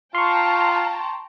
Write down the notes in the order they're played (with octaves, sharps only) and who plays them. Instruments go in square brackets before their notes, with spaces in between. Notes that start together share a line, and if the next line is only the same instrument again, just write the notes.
[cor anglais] F4 [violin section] G5 A5 A#5 [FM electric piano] C6 C#6